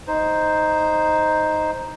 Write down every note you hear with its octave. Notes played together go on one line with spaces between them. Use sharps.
D#4 C5